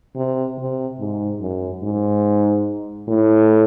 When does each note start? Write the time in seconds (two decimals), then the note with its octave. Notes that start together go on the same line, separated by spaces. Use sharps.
0.16 C3
0.58 C3
1.00 G#2
1.40 F#2
1.83 G#2
3.08 A2